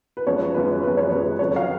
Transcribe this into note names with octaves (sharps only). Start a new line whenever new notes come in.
B4
F#2 F3 G#3 C#5
F#2 F3 G#3 B4
F#2 F3 G#3 B4
C#5
F#2 F3 G#3 B4
F2 C#3 F#3 C#5
F5